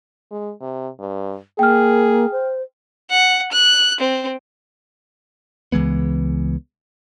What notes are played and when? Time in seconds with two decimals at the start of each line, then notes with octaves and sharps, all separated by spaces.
0.32 G#3
0.61 C3
0.99 G2
1.59 A#3 G#4 G5 F6
2.32 C5
3.10 F#5
3.52 F#6
4.00 C4
5.72 C#2 E3 G#3 B3